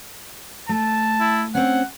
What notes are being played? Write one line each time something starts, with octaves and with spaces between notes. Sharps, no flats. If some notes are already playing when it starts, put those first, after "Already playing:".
A3 A5
E4
C4 C#4 F#5